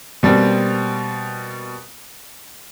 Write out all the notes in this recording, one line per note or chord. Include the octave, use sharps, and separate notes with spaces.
B2 G3 A#3 C4